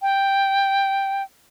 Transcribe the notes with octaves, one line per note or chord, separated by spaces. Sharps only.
G5